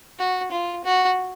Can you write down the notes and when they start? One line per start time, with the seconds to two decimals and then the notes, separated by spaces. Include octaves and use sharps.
0.19 F#4
0.51 F4
0.84 F#4